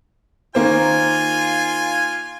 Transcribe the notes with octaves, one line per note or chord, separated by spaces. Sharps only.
D#3 A#3 F4 C5 G#5